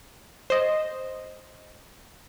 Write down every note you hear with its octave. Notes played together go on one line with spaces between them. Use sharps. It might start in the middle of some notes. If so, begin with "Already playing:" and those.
C5 D#5